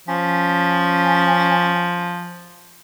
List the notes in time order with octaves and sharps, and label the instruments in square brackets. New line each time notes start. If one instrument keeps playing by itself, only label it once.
[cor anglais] F3 [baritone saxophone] C#4